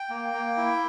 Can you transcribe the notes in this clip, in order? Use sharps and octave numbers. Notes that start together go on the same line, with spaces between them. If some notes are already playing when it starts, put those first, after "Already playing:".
Already playing: G5
A#3
A#3
E4